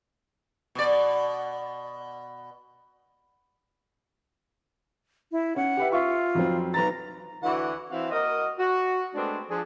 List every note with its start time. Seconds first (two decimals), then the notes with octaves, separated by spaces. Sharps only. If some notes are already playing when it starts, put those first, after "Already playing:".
0.75 B2 D5
5.32 E4
5.56 C#4 F#5
5.77 G4 B4 E5
5.92 F4 E5 C#6
6.35 F2 F#3 C4
6.74 B1 B4 A#5 A6
7.43 D2 E3 E4 F#4 D5 F#5
7.92 E3 C4 F#4 C5 E5 F5
8.12 A#3 F#4 A#4 D#5
8.59 F#4
9.15 G#3 A3 B3 C4 D4
9.50 F3 D4 G#4